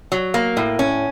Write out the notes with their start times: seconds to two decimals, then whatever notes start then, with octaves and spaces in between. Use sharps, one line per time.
0.12 F#3
0.34 A#3
0.57 A2
0.79 C#4